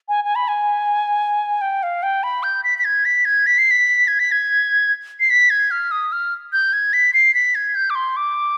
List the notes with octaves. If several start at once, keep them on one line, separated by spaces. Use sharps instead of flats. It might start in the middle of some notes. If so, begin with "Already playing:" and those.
G#5
G#5
B5
G#5
G5
F5
G5
B5
G6
B6
B6
G#6
B6
G#6
B6
C7
B6
G#6
B6
G#6
C7
B6
G#6
F6
D#6
F6
G6
G#6
B6
C7
B6
G#6
G6
D6
C6
D6